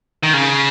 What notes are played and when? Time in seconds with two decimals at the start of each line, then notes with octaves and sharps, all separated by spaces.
0.23 D#3
0.33 C#3